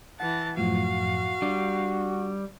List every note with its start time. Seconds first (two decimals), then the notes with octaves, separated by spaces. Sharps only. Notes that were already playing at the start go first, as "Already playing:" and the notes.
0.20 E3 F#5 A5
0.57 F#2 A2 F3 F#4 F5
1.42 G3 D4